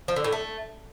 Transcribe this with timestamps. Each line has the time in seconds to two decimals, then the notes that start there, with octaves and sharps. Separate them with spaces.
0.08 F3
0.16 D3
0.24 A2
0.32 A3